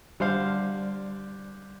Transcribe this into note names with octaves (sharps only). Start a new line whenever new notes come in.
D3 G3 C5 F5